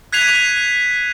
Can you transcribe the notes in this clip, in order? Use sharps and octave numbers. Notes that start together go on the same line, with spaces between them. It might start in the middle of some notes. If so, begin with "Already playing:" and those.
F#6 G#6 B6 C7 D#7 F7